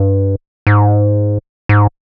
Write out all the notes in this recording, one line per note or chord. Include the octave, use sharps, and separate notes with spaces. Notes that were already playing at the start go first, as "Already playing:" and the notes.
Already playing: G2
G#2
G#2